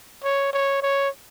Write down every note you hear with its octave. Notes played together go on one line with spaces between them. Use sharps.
C#5
C#5
C#5